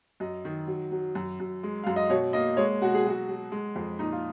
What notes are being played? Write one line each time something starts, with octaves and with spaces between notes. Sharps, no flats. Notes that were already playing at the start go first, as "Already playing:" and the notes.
F#2 D#5
D#3
F#3
F#3
F#2
F#2
G#3
F#2 F5
D#5
B2 C#5
A#3 D#5
G#3 C#5
B2 F#4
G#4
F#3 F#4
F#3
G#3
F2
A#2 D#4
F4